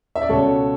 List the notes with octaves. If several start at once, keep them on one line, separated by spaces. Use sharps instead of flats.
E5
D5
C#2 B2 A4 C#5